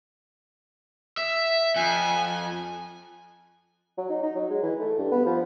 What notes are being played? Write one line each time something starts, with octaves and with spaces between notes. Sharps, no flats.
E5
F2 G#5
F#3
D#4
D#4
F#3
G#3
E3
A3
G2
B3
F3